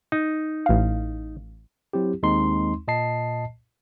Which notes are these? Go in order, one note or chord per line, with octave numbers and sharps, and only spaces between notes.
D#4
A1 F5
F#3 C4 E4 G4
D#2 G#3 C4 D#4 C6
A#2 D#5 A5 C7